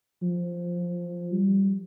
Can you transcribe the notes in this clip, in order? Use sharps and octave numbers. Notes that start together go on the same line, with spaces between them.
F3
G3